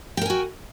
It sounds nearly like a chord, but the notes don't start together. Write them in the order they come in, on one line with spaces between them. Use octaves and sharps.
G5 A#4 G#5 F#4